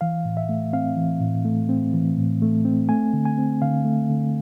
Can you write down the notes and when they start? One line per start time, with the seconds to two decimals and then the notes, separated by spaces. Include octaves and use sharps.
0.01 E3 F5
0.25 A2
0.37 E5
0.49 A3
0.73 C4 F5
0.97 E3
1.21 A2
1.45 A3
1.69 C4
1.93 E3
2.17 A2
2.42 A3
2.65 C4
2.89 A3 G#5
3.13 D3
3.25 G#5
3.38 C4
3.61 D3 F5
3.85 A3
4.09 D3